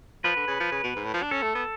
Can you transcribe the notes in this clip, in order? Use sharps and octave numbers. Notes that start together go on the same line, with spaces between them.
F3 B4
D3
C#3
F3
C#3
B2
G#2
A2
F3
D4
C#4 A4
A3
B3